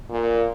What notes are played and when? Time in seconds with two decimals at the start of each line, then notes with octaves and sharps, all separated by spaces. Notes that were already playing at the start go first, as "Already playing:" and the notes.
0.11 A#2